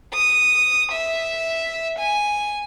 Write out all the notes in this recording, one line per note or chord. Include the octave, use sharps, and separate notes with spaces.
D#6
E5
G#5